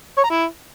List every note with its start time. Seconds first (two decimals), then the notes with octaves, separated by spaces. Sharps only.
0.18 C#5
0.24 A#5
0.30 E4